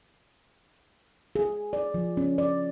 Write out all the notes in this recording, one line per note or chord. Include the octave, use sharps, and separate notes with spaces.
G#4
D5
F3
C#4
D5